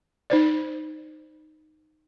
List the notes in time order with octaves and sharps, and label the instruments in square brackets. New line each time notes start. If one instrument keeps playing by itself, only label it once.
[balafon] D#4 C5 D5